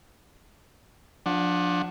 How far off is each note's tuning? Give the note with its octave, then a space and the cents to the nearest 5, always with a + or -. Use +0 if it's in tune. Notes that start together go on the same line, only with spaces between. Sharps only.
F3 +30 D4 +0 F#5 +0